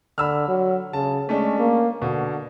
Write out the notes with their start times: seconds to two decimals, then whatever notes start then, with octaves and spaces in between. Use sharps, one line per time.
0.18 D3 B5 E6 F6
0.48 F#3
0.93 C#3 A5
1.29 G#3 A3 C#4 D4
1.59 A#3
2.02 B2 D3